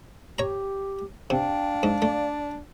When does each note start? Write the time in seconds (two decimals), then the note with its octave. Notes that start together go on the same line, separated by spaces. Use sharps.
0.39 G4 C#5 A#5
1.30 C3 D4 F5 G5
1.83 G#2
2.02 A3 D5